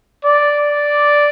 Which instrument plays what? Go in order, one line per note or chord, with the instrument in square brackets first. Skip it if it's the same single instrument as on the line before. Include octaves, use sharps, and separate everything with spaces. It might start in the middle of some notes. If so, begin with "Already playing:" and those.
[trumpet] D5